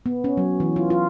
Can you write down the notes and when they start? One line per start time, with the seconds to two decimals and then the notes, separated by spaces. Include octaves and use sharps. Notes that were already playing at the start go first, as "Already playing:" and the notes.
0.06 B3
0.24 C#4
0.37 F#3
0.60 E3
0.76 F4
0.90 F4